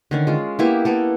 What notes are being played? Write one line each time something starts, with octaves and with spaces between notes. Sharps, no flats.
D3 D#3 C#4
G#3 F4
A#3 B3 E4 G4
A#3 B3 A4